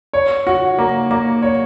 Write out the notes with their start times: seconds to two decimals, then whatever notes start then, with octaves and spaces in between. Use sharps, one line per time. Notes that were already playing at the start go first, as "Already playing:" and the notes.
0.13 C#5
0.47 F#4
0.78 A#3
1.11 A#3
1.42 C#5